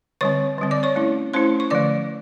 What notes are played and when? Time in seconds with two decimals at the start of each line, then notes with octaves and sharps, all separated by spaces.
0.21 D3 G3 C4 C#5 C#6
0.58 D3 G3 C4
0.71 D5 D6
0.83 C#5 C#6
0.96 A3 C#4 E4
1.34 A3 C#4 E4 C5 C6
1.60 C#6
1.70 D3 F3 A3 D5 D6